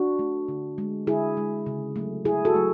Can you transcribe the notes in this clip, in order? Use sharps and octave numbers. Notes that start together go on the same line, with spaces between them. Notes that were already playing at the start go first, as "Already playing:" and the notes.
Already playing: D4 F#4
A3
D3
G#3
D3 E4 G#4
G#3
C#3
F#3 A3
C#3 E4 G#4
F#4 A4
F#3 A3